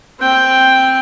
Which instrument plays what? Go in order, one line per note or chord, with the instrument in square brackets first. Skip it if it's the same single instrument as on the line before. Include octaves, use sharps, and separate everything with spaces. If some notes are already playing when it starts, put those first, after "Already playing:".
[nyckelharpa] C4 G5